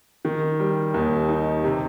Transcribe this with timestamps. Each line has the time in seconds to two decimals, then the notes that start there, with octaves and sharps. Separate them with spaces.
0.25 D#3
0.60 G3
0.94 D#2
1.29 D#4
1.64 C3